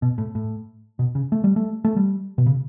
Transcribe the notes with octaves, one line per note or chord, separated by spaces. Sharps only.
B2
A2
A2
B2
C#3
A3
G3
A3
A3
G3
B2
C#3